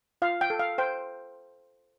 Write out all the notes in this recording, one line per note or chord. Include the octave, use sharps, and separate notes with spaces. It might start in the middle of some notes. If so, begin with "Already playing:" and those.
F4 F5
G5
A4
F5
C5 G5